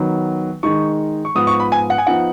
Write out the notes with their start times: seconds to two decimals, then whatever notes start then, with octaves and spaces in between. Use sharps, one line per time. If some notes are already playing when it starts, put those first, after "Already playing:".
Already playing: D#3 F#3 B3 D#4
0.63 D#3 G#3 D#4 C#6
1.25 C#6
1.35 G#2 F3 B3 D#6
1.47 C#6
1.60 B5
1.72 G#5
1.90 F#5
1.98 G#5
2.07 F3 B3 D#4 F#5